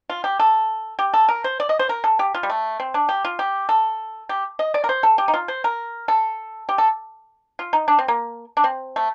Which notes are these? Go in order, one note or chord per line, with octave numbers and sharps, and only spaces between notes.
F4
G4
A4
G4
A4
A#4
C5
D5
D#5
C5
A#4
A4
G4
F4
G3
A3
C4
D4
G4
F4
G4
A4
G4
D#5
D5
A#4
C5
A4
G4
D#4
F4
C5
A#4
A4
G4
A4
F4
D#4
D4
C4
A#3
D4
C4
A3